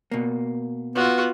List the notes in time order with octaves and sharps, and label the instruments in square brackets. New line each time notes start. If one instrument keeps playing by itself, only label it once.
[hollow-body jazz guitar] B2 A#3
[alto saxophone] B3 [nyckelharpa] F4 F#4